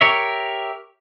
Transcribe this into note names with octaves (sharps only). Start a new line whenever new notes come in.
G4 A#4 C#5 E5